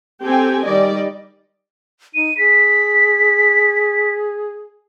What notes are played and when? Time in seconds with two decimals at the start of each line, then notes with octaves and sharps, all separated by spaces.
0.22 C4 G4 A4 G5 G#5
0.64 D#3 G3 D5 D#5
2.15 D#4 D#7
2.38 G#4 B6